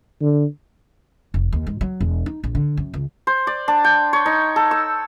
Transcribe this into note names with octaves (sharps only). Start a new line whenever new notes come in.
D3
F1
D#2
G#2
F#3
E1
D#4
A#1
D3
F#2
C#2
C5
D5
D4
G5
C#5
D#4
A4
E6